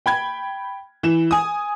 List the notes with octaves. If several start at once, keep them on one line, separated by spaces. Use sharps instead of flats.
G5 B5 G#6
E3 E7
G#5 D#6